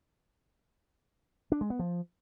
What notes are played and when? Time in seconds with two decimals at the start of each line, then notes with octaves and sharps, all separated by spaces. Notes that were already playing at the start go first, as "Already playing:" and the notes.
1.52 D4
1.61 G#3
1.70 B3
1.79 F3